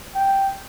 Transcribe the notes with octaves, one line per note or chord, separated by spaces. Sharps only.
G5